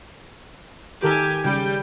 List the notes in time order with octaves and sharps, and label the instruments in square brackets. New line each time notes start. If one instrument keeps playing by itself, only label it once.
[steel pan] D#3 A4 A#4 [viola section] G4 G#5
[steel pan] C#3 [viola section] G3 G5